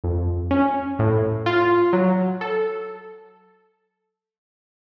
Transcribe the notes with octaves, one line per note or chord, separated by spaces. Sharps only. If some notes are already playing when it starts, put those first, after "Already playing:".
F2
C#4
A2
F4
F#3
A4